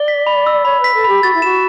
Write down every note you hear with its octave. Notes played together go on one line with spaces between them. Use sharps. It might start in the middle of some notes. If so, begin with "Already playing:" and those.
Already playing: D5 G7
B6
B5
E6
C#5 B5
B4 B6
A4
G4 B5
F#4 A6
E4
F#4 E7